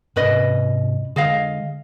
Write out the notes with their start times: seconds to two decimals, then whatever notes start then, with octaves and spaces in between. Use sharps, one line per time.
0.16 G#2 C3 C#4 B4 D#5
1.16 D3 G#3 G#4 D#5 F5